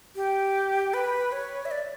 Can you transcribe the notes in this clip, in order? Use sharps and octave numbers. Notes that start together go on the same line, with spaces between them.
G4
B4
C#5
E5
D5